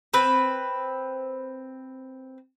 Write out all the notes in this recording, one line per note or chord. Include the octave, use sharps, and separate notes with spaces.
C4 B4